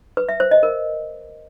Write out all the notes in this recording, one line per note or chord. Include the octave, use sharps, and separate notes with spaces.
B4
E5
C5
D#5
A#4